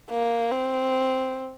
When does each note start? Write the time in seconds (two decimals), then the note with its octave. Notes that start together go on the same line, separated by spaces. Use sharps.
0.11 A#3
0.52 C4